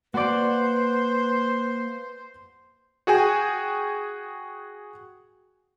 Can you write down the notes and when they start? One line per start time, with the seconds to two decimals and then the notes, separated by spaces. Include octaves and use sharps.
0.14 A#3 F#4 B4 C5 D5 F#5
3.07 F#4 G#4 G5 G#5